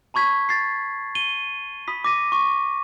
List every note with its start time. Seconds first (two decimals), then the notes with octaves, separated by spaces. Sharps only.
0.14 A5 B5 C#6 G#6 B6
0.49 A6 C7
1.15 D#7 G7
1.88 B5 D#6 B6
2.04 D6 A#6 D#7
2.32 C#6